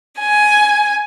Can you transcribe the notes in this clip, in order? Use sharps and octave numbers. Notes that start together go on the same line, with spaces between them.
G#5